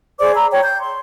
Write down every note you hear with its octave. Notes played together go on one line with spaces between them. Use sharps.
G#4 C5 D5 D6
A#5 B5 E6
C#5 G5
G6
C6